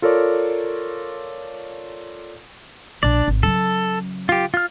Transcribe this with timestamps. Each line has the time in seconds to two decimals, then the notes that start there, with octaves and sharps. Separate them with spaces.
0.02 F4 A4 A#4 C#5 D5
3.03 A#1 D4 D5
3.28 G#1
3.43 C#3 F#3 A4
4.29 F4 G4
4.54 F4 F6